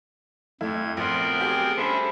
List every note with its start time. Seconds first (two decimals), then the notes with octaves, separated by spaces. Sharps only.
0.61 F2 A3 E4 G#6
0.97 A#1 B3 C4 A#4 F#5 C6
1.39 F#3 G4 G#4
1.77 G3 C#4 D4 A4 C5 E5 B5